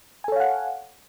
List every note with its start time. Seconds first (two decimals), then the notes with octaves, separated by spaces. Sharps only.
0.24 G#5
0.28 A4
0.32 C#5
0.36 F5
0.40 F#5